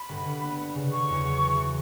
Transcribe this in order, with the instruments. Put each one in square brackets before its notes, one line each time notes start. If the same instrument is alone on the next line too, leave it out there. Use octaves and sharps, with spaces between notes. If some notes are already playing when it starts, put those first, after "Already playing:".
Already playing: [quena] B5
[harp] G1
D3
B3
B3
C#3
[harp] C#3 [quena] C#6
[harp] E2
F#3
E3
E3